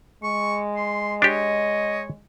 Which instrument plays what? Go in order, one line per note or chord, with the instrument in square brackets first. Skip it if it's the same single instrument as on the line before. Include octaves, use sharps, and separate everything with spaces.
[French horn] G#3 [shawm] C#6
[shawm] C6
[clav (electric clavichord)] D4 G4 [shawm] C#5 [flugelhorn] D#5